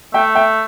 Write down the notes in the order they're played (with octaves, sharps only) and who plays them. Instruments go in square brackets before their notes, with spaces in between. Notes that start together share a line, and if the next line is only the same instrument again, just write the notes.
[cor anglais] A3 [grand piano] E5 G5
[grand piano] E5 G5